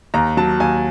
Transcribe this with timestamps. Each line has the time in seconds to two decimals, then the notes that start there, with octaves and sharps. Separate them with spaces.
0.14 D#2 A#5
0.37 F#3 A5
0.60 D#2 G#5